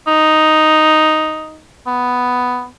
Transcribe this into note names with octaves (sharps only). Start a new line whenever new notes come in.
D#4
B3